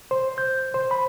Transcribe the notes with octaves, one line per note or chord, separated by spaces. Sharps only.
C5
G6
C5
B5